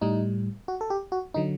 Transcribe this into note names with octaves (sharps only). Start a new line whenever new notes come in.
A2 G3 D#4
F#4
A4
G4
F#4
D3 F#3 D#4